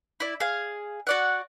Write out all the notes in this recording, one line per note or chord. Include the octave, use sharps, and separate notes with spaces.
E4 D5
G#4 F5
F#4 D5 F#5